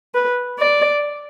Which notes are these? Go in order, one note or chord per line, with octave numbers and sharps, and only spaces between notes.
B4
D5